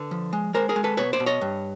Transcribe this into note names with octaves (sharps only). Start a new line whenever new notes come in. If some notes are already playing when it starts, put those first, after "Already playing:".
Already playing: D3 B4
F3
G#3
G#3 A#4 C5
G#4 A#4
G#3
A4 B4
B2 B4 C#5
C5 D5
B2
C#5 D#5
G2